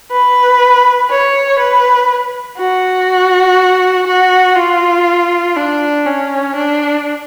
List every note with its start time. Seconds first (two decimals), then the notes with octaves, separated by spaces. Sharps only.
0.11 B4
1.10 C#5
1.59 B4
2.58 F#4
4.07 F#4
4.56 F4
5.56 D4
6.06 C#4
6.56 D4